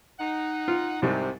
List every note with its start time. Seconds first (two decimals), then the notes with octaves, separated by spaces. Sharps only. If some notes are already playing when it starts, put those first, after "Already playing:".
0.19 D#4 F#5
0.68 F4
1.02 C2 G#2 C3 G3